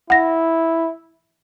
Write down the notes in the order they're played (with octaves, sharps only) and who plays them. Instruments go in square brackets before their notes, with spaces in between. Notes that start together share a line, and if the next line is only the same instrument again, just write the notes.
[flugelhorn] E4 [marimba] F#5 A#6